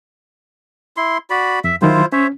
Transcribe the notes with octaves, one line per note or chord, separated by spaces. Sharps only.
E4 C6
F#4 D5 B5
F2 E5
D#3 F#3 E4 F4 C5
C#4 C5 C#5 E5